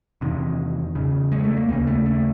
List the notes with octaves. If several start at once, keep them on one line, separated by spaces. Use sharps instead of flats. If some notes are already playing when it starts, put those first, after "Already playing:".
E2 C3 D#3
E2 C#3
G#3
A3
A#3
D#2 C#3 A#3
A3
A3